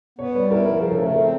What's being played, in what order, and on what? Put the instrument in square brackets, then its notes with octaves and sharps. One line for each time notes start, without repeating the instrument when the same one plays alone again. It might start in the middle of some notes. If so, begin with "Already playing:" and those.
[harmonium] B3 [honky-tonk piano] C#5
[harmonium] G3 [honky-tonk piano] B4
[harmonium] E4 [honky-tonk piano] A#4
[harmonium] F3 [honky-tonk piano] A#4
[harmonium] C#3 [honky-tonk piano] G#4
[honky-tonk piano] A4
[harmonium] A3 [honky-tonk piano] A#4
[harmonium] C4 [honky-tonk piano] A4